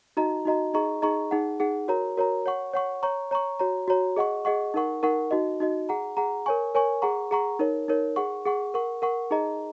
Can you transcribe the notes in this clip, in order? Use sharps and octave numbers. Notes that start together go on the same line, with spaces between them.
D#4 F#4 D#5 A#5
D#4 F#4 D#5 A#5
D#4 G#4 D#5 A#5 C#6
D#4 G#4 D#5 A#5 C#6
D#4 G#4 F#5
D#4 G#4 F#5
F#4 A#4 C#5 A#5
F#4 A#4 C#5 A#5
C#5 F#5 C#6
C#5 F#5 C#6
C#5 A#5 C#6
C#5 A#5 C#6
F#4 C#5 A#5
F#4 C#5 A#5
G#4 D#5 F#5 C#6
G#4 D#5 F#5 C#6
D#4 A#4 F#5 C#6
D#4 A#4 F#5 C#6
D#4 F#4 D#5
D#4 F#4 D#5
G#4 F#5 A#5
G#4 F#5 A#5
A#4 C#5 G#5 C#6
A#4 C#5 G#5 C#6
G#4 F#5 A#5 C#6
G#4 F#5 A#5 C#6
D#4 A#4 C#5
D#4 A#4 C#5
G#4 F#5 C#6
G#4 F#5 C#6
A#4 F#5 C#6
A#4 F#5 C#6
D#4 G#4 D#5 A#5